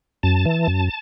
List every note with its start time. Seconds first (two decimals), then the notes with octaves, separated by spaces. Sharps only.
0.23 F#2 A5
0.46 E3
0.67 F#2